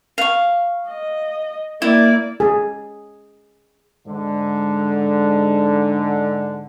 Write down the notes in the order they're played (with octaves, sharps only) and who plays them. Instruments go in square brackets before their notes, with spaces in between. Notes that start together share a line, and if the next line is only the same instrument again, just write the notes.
[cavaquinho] F5 C#6
[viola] D#5
[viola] A#3 D5 [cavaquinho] E4
[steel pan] G#4
[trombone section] G#2 D3